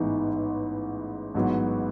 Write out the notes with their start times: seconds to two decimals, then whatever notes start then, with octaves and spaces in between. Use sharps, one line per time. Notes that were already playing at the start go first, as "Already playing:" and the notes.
Already playing: A1 G#2 E3 B3 D#4
1.35 A1 G#2 F#3 B3